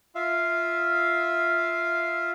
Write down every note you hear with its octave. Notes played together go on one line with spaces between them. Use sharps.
F4 E5 F5